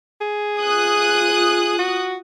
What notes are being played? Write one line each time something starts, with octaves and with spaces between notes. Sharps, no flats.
G#4
F4 D#6 F#6
F#4